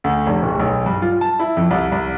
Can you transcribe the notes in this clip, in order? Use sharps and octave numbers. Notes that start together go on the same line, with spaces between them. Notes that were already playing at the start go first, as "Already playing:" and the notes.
D2
F1
D1
B1
G2
F4
A5
E4
F2
C2
C2